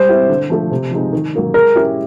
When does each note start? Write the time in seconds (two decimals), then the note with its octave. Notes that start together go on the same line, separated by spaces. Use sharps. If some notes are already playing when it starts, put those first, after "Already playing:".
Already playing: G3 C5
0.09 C4 E4 G4
0.29 D3
0.50 F3 A3
0.71 C3
0.91 F3 G#3 C4 D#4
1.13 D#3
1.34 F#3 A#3 C#4
1.54 G#3 A#4
1.75 C#4 E4 G4